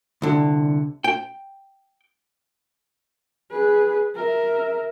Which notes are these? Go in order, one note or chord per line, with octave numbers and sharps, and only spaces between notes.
C2 D3
G5
G#4 B4
A#4 E5